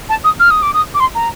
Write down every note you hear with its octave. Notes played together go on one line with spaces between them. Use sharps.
A5
D#6
F6
D#6
D6
D#6
D6
C6
A#5